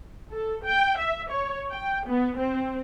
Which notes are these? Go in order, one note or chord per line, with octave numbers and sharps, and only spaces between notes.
A4
G5
E5
C#5
G5
B3
C4